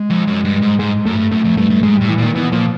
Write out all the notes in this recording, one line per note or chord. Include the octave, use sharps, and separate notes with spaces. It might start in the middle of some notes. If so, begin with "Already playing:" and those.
Already playing: G#3
F2
F#2
G2
G#2
G#2 G#3
F#2 A3
G2
F#2 A3
F2
G2 A3
G2
G#2 G#3
A2 G3
E3
A#2 D#3
B2 E3
A#2 F3